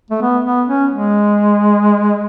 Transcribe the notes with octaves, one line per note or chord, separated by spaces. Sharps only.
A3
B3
B3
C#4
G#3